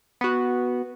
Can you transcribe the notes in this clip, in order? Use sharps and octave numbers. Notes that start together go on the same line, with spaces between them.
B3 F#4